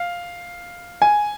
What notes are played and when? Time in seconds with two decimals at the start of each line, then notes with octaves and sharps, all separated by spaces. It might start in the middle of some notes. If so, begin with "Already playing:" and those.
Already playing: F5
1.02 G#5